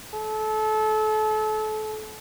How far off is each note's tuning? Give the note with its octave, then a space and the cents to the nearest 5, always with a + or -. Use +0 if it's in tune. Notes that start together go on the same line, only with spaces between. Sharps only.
A4 -30